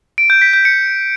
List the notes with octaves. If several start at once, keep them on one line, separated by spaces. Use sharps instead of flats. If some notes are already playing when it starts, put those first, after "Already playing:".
D7
G6
B6
G6
C#7